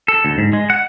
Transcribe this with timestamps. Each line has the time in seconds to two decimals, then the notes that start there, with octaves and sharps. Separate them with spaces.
0.08 A4
0.25 D2
0.38 G#2
0.53 G#3
0.70 F#5